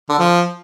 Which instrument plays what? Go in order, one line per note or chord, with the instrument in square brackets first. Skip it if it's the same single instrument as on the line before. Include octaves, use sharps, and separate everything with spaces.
[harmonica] D3
F3